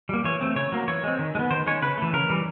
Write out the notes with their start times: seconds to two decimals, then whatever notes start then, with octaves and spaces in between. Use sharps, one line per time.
0.09 G3 A#3
0.24 E3 C#5
0.41 A3 C4
0.56 C#3 C#5
0.72 F#3 A#3
0.88 E3 C#5
1.03 G#3 C4
1.19 D#3
1.35 G#3
1.39 B3
1.50 D#3 C5
1.67 G#3 C#4 C#5
1.82 C#3 B4
1.98 E3 A3
2.13 C#3 A#4
2.29 E3 G3